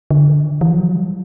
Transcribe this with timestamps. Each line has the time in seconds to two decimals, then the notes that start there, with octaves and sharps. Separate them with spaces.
0.11 D3
0.44 D#3
0.61 E3
0.70 F3
0.78 F#3
0.95 G3